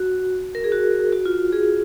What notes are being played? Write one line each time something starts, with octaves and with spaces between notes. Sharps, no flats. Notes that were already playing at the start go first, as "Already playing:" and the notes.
Already playing: F#4
A#4
G#4
F#4
F#4
F4
G#4